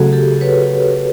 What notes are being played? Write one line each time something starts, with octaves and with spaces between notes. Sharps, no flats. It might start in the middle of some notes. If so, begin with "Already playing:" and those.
Already playing: C#3 F#3 A3 F#4 G#4
G4 A4
B4 C#5